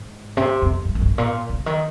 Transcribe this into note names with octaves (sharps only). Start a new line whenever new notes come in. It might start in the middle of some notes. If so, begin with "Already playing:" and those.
Already playing: G#2
C3
F2
F#2
F#2
G#2
A#2
C#3
D#3